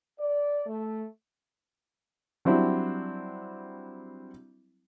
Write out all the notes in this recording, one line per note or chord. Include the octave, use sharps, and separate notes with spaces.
D5
A3
F#3 G3 C4 D4 E4